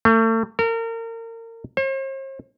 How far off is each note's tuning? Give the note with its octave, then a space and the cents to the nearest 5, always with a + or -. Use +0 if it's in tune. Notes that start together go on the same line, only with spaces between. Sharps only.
A3 +40
A#4 -35
C5 +45